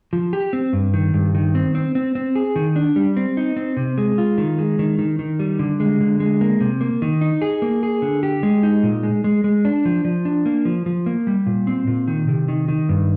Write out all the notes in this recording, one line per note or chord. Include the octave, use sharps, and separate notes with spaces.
F3
G4
C4
G2
D#3
G2
D#3
C4
C4
C4
C4
G#4
D#3
D4
G3
C4
D#4
C4
C3
G#3
F4
D#3
G#3
D#3
D#3
D#3
G3
D3
G#3
D3
G#3
A#3
C3
A#3
D#3
D#4
G#4
A#3
G#4
D3
G4
G#3
D#4
A#2
G#3
G#3
G#3
D4
F3
F3
D4
A#3
F3
F3
A#3
G3
A#2
C4
A#2
D#3
C3
D#3
D#3
G2